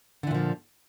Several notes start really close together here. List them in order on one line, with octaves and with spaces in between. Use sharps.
D3 E3 A#2 F3